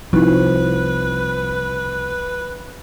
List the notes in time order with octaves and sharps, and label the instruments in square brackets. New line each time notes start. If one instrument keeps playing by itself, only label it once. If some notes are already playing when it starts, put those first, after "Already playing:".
[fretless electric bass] C2 [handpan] F3 [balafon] D#4 E4 [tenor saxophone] B4